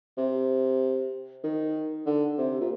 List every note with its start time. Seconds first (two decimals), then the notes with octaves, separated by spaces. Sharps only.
0.18 C3
1.44 D#3
2.06 D3
2.38 C3
2.61 A#2